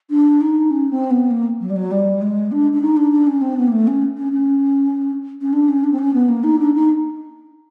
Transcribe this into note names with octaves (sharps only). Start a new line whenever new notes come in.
D4
D#4
C#4
C4
B3
A#3
F#3
G3
F#3
G3
G#3
D4
D4
D#4
D4
D4
C#4
C4
B3
A#3
A3
C#4
C#4
C#4
C#4
D4
C#4
D4
C4
C#4
B3
A#3
D#4
D4
D#4